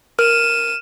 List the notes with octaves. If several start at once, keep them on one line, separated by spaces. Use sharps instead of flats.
A#4 F6 D#7 E7